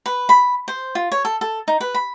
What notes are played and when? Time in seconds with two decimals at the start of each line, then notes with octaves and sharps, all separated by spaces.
0.06 B4
0.29 B5
0.68 C5
0.95 F4
1.12 C#5
1.25 A4
1.41 A4
1.68 D#4
1.80 B4
1.94 B5